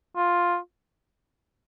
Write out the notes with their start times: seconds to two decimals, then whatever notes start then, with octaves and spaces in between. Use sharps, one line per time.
0.16 F4